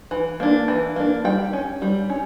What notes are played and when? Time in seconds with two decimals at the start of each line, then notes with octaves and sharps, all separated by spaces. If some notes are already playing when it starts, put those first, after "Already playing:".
0.11 E3
0.40 A#3 D4
0.68 E3
0.96 A#3 D4
1.24 G3 G5
1.53 C#4
1.82 G3
2.10 C#4